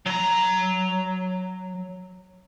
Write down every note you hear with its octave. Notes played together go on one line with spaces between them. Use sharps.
F#3 A#5